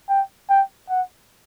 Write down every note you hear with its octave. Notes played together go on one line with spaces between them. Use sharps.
G5
G5
F#5